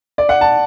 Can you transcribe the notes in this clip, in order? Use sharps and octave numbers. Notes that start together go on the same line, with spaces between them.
D5
F#5
A5